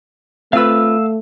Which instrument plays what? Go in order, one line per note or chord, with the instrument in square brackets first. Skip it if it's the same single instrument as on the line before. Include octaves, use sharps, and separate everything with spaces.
[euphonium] A3 [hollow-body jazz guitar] C4 F4 B4 [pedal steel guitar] F5 E6